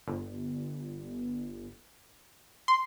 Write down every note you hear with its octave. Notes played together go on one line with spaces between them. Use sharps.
G1
C6